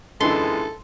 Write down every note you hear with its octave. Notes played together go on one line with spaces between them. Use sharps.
F#2 A#2 D3 E3 G#3 E4 A4 C6